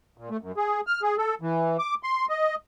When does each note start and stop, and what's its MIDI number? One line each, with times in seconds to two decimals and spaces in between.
0.18 0.29 46
0.30 0.37 57
0.41 0.52 42
0.57 0.81 68
0.87 1.01 89
1.02 1.16 68
1.18 1.35 69
1.42 1.77 52
1.79 1.95 86
2.03 2.26 84
2.29 2.55 75